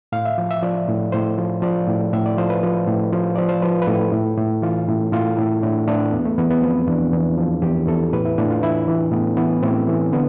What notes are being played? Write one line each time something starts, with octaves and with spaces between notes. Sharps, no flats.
A2 F5
E5
F3
E5
F3 D5
A2
A2 C5
F3
F3 D5
A2
A2 E5
D5
F3 C5
B4
F3
A2
F3
F3 D5
C5
F3 B4
B4
A2 A4
A2
A2
E3 F4
A2
A2 F4
A2 E4
A2 D4
A2 D4
E2 B3
A3
E2 B3
B3
F3 C4
E2 D4
E2
F3
E2 G4
E2 A4
A2 B4
E4
A2 D4
F4
E3 E4
E3
A2 B3
E3 B3
A2 C4
E3
D3 B3